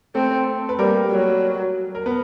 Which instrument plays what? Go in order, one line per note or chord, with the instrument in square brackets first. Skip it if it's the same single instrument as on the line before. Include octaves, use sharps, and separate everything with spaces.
[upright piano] A3 A4 [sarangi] C4
[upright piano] B4
[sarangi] G3 [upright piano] A#3 A#4
[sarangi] F#3
[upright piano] A#4
B3 B4